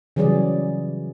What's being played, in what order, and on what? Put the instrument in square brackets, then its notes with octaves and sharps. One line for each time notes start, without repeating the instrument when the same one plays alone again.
[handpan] C#3 E3 F#3 G3 G#4 D5